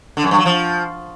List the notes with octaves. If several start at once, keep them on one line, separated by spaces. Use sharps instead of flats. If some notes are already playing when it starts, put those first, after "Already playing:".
D3
F#2
G2
F#3
F3